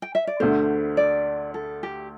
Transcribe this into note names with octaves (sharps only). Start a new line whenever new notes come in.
G5
E5
D5
D2 D3 A3 C5
D5
A4
G4